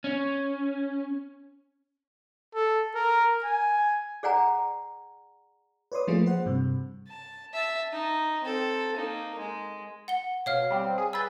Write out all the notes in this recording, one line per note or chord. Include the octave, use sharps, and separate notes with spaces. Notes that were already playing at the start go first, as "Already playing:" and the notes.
C#4
A4
A#4
G#5
G#4 D5 F#5 G#5 A#5
B4 C#5 D5 C6 D#6
F3 A3 A#3 F4 G#4
C5 F#5
G2 C3
A5
E5 A5
D#4
C4 A4
A#3 D#4
G#3
F#5 G7
B2 C#5 F5 F6
G3 C4
G#4
G#4 B4 E6 G6 A6